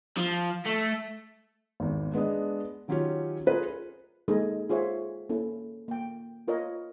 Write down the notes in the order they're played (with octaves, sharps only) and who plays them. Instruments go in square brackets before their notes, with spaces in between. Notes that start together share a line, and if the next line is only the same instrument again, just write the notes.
[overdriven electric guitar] F3
A3
[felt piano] G#1 E2
G#3 B3 D4 D#5
D#3 F#3 C#4 F4 G4 C#5
F4 G#4 A#4 B4
[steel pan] G#3 A#3 D#4 G#4 A4 D#5
F4 G#4 C5 C#5 E5 F#5
A#3 C#4 E4 A4
A#3 G5
F4 A#4 B4 C#5 D#5